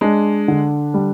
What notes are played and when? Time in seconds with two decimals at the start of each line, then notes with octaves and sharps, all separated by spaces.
0.01 G#3 D4
0.48 D3
0.94 G3